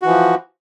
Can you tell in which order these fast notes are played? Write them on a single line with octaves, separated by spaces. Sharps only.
F#4 E3 F3